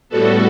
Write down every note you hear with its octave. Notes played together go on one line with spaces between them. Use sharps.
A2 G3 B3 F#4 A4